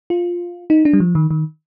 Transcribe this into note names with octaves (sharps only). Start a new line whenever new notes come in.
F4
D#4
D4
G3
F3
D#3
D#3